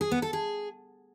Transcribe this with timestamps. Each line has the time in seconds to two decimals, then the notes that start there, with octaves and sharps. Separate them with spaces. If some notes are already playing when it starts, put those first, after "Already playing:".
0.01 G#4
0.12 B3
0.22 A4
0.33 G#4